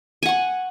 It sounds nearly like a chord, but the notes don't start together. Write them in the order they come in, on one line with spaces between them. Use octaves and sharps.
G#5 F#5 C#6